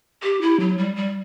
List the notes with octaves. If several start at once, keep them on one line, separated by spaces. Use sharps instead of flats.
G4
E4
F#3
G3
G3